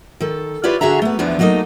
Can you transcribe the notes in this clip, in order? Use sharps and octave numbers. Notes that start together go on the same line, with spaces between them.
D#3 A4
E4 F4 G4 B4 C#5 D5
D3 F#4 G#4 E5 A#5
A3 B3
E2 E3 F3 B3 D4
F#3 A3 A#3 D#4 D#5